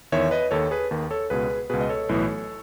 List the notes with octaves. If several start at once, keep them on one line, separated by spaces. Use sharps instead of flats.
E2 D#3 C#5 E5
B4 D#5
D#2 D#3 A4 C#5
G#4 B4
D#2 D#3
A4 C#5
C#2 B2 G#4 B4
C#2 B2 G#4 B4
D#5
A4 C#5
B1 A2 E3